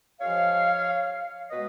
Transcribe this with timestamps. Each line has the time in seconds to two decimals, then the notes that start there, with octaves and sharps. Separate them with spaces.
0.19 F#2 F3 G#3 C#5 F5
1.50 B2 G#3 B4 D#5